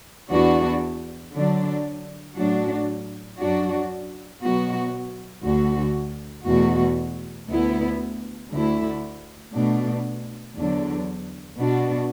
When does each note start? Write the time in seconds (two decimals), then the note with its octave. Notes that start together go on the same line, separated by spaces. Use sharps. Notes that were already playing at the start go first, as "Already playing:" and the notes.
0.30 E2 E3 B3 D4 F#4
1.33 D3 F#3 D4
2.35 A2 F#3 D4 F#4
3.37 F#2 F#3 D4 F#4
4.41 B2 F#3 B3 F#4
5.43 D2 D3 A3 F#4
6.46 E2 B2 A3 F#4
7.48 D2 D3 B3 E4
8.51 D2 D3 A3 E4
9.54 B2 A3 D4
10.56 E2 D3 F#3 D4
11.58 B2 B3 D4 F#4